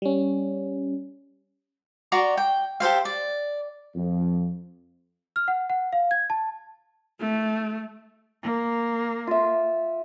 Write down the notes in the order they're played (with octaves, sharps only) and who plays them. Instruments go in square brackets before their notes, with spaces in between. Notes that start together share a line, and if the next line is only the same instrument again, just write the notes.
[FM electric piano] G3 C#4
[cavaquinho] F#4 D5 A#5 C6
G5
G4 A4 C5 F5
D5
[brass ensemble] F2
[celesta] F6
F#5
F#5
F5
G#6
A5
[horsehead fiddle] A3
[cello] A#3
[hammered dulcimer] F4 E5